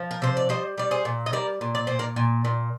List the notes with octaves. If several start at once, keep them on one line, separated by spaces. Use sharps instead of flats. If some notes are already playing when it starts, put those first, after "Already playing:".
Already playing: F3
A#4
C3 C5
D5
G3 C5 D#5
G3 D5
G#4 C5
A#2
D#5
G3 A#4 D5
A#2
D5
A#2 C5
A#4 D5
A#2
A#2